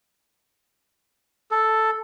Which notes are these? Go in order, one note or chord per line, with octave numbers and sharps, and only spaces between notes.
A4